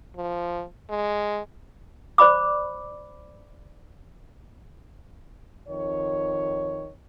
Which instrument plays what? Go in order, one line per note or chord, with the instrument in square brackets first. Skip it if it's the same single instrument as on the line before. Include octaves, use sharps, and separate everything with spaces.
[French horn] F3
G#3
[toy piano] C5 D5 B5 D6
[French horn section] F2 D#3 C#5